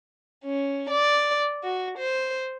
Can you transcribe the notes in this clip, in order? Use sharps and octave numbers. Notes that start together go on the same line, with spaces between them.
C#4
D5
F#4
C5